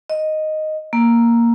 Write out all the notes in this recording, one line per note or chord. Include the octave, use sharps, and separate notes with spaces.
D#5
A#3